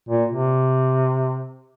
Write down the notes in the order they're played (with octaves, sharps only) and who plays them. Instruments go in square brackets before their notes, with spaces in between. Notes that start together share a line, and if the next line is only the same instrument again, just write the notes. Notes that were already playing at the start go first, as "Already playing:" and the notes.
[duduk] A#2
C3